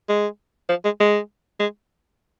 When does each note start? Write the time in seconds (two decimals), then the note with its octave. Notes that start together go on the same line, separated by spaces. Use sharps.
0.09 G#3
0.69 F3
0.85 G#3
1.00 G#3
1.60 G#3